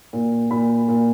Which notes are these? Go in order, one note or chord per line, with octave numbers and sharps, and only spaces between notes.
A#2
A#2 B5
A#2